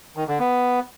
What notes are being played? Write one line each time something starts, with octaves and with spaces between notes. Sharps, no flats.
D#3
D3
B3